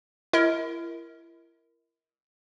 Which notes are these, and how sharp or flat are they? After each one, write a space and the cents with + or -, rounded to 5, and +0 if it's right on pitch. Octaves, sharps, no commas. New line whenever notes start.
E4 +35 A#4 +0 D#5 +45